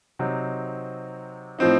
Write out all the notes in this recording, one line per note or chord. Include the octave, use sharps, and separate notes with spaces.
C3 F#3 C4 D#4
A2 F3 C4 D#4